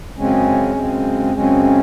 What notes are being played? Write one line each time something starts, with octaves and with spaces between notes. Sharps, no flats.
F#2 C#3 G#3 C4 C#4
F#2 C#3 G#3 C4
F#2 C#3 G#3 C4 C#4
C#4